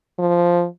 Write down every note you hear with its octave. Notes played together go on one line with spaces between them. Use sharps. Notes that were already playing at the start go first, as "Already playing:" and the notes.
F3